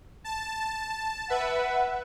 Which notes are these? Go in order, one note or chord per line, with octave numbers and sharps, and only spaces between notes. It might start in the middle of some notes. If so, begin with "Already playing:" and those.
A5
B4 E5 F#5